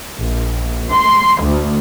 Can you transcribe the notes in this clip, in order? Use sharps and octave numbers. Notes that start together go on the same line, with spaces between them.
A#1
C6
D2